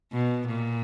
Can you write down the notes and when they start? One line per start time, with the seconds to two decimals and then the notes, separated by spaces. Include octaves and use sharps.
0.13 B2
0.48 A#2